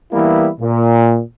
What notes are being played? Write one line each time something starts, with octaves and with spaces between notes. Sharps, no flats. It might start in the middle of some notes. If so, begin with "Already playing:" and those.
E3 G3 A#3 B3 E4
A#2